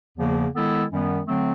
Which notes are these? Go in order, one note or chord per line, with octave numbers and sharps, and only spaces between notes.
E2 C#3 F3 A#3
D#3 G#3 B3 E4 A4
F#2 D#3 G3 B3
D3 F#3 A3 C4